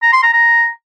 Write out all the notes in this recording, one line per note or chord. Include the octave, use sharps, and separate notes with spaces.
A#5
C6
A#5
A#5